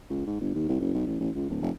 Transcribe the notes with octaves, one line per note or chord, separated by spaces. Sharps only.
C#2
G#2
G1
D#2
C2
F#1
B1
A1
A1
C#2
D1
F1